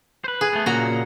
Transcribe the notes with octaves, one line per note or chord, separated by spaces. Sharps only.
B4 C5
G#4
A3 B3
A#2 C#3 A#3 F#4 A#5